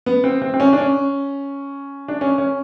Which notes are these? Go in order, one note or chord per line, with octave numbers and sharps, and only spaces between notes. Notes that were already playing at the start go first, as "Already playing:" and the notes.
B3
C4
C4
C4
C#4
D4
C#4
D4
C#4
C#4